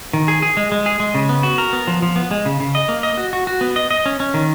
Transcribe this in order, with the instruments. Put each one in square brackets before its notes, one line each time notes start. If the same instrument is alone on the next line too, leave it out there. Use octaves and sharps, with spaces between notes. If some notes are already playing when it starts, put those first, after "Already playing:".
[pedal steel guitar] D#3
G#4
G#4
G#3
G#3
G#4
G#3
C#3
B3
F#4
A#4
B3
F3
F3
B3
G#3
C#3
C#3
D#5
A#3
D#5
F#4
F#4
F#4
B3
D#5
D#5
C#4
C#4
D#3